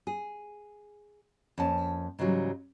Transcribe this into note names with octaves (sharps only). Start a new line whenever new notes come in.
G#4
F2 A#3 C#4 A5
G#2 C#3 E3 F#3 G3